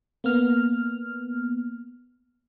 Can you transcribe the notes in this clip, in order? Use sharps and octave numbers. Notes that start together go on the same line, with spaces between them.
A#3 B3 F6